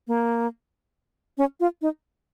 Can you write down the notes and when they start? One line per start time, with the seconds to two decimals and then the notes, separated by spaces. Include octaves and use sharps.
0.08 A#3
1.38 C#4
1.60 F4
1.82 D#4